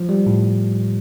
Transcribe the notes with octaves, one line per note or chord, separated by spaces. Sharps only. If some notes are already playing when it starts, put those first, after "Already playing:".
Already playing: F3
G3
A2